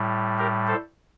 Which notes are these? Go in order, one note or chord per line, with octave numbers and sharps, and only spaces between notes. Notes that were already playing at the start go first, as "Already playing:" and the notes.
Already playing: A2 G3
G4 A#4
A4 C5